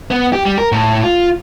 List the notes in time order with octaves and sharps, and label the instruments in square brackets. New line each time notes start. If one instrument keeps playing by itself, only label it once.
[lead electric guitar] B3
G4
G3
A#4
A2
F4